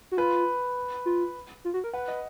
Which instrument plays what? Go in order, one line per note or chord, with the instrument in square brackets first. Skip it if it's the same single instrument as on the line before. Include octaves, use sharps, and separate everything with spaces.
[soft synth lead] F#4
[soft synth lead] F4 [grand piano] B4
[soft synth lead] F4
F4
F#4
A#4
[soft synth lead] B4 [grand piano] F#5
[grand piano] D#5